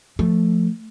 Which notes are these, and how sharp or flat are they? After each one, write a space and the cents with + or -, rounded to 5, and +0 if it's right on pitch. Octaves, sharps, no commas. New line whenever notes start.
F3 +0 A3 +0